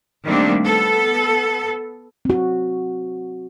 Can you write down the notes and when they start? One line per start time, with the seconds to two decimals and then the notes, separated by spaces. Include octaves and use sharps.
0.25 D#3 G3 A3 A#3 C4 D4
0.64 B3 A4
2.25 C4 F#4